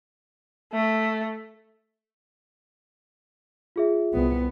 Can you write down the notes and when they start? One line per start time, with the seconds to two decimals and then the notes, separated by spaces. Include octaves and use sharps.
0.73 A3
3.76 F4 G#4 E5
4.14 C2 B3